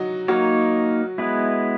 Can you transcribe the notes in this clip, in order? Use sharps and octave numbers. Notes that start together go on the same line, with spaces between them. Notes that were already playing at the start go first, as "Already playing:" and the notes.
Already playing: F#3 D#4 F#4
F#3 A#3 D#4 F#4 A#4 C#5
G#3 B3 E4 B4